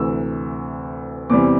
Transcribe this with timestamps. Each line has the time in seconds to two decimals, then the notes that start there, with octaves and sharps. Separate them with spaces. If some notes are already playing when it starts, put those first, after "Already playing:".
Already playing: D2 C3 E3 E6
1.30 E2 C3 E3 G3 C4 D6